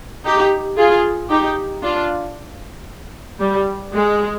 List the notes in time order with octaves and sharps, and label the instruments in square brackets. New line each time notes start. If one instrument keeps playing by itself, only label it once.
[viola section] D#4 G4
F4 G#4
D#4 G4
D4 F4
G3
G#3